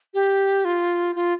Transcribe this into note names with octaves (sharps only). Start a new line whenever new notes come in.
G4
F4
F4